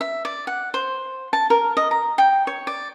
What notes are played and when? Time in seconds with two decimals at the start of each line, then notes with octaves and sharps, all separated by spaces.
0.01 E5
0.25 D5
0.47 F#5
0.74 C5
1.33 A5
1.50 A#4
1.77 D#5
1.91 A#5
2.18 G5
2.47 C#5
2.67 D5